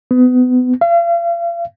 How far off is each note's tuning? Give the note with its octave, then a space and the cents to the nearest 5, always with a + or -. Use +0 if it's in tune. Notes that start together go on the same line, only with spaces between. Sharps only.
B3 +30
F5 -40